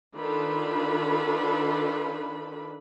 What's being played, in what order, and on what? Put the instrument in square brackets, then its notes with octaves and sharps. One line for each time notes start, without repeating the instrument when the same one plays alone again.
[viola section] D#3 D4 F4 A4 B4 B5